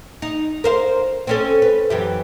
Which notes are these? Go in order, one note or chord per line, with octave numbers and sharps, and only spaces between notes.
D#4
A#4 C5 F5
C4 C#4 A4
B4
F#2 E3 G4